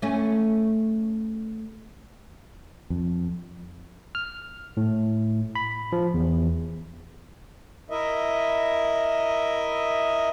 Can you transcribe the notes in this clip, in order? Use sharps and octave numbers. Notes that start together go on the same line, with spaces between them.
A3 C#4
F2
F6
A2
B5
F3
E2
E4 A#4 D#5 E5